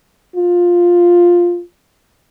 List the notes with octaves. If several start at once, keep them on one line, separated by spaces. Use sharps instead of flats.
F4